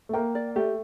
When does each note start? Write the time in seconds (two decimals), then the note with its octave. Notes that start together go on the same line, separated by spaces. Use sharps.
0.09 A3
0.13 A#3 G5
0.35 D5
0.56 A3 G4